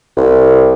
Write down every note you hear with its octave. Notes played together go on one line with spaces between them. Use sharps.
C2